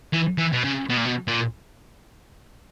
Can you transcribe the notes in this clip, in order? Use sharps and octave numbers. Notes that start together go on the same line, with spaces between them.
E3
E3
B2
C#3
B2
A#2
B2
A#2